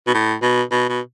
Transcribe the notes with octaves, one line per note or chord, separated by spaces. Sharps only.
B2
A2
B2
B2
B2